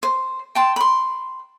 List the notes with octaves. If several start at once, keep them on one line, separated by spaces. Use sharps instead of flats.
C5
G5 A5 C6
B5 C6